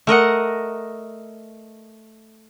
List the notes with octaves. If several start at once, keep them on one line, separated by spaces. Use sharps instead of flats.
A3 A#4 D#5 F#5